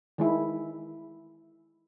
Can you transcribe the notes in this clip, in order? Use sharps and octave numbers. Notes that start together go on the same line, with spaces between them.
D#3 G#3 E4